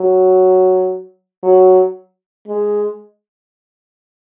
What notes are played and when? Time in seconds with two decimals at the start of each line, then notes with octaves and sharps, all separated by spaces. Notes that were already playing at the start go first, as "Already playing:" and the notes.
Already playing: F#3
1.43 F#3
2.48 G#3